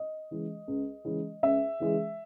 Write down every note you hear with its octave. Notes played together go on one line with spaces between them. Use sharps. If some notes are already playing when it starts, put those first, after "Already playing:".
Already playing: D#5
C#3 E3 G#3
C#2
C#3 E3 G#3
C#2 E5
C#3 E3 G#3